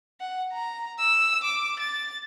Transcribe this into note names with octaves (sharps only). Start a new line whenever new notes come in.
F#5
A#5
E6
D6
A6